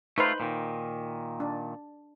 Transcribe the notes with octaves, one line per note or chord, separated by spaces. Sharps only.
A3 D#4 F4 B4 C5
A#2 D#3
D4